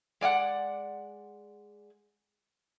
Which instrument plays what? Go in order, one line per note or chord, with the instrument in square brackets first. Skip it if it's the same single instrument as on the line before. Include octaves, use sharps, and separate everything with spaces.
[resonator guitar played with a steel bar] G#3 D5 F5 F#5